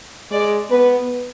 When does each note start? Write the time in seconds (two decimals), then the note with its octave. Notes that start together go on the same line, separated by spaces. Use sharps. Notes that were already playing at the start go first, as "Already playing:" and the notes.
0.32 G#3 D5
0.70 B3 B4